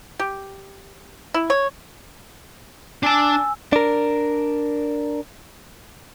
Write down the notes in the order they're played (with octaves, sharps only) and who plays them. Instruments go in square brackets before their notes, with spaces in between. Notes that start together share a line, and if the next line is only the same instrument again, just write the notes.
[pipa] G4
E4
C#5
[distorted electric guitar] D4 A5 [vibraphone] G#5 E6
[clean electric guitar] D4 A#4